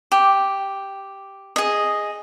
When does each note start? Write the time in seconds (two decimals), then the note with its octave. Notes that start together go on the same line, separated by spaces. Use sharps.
0.12 G4
1.56 G#4 D#5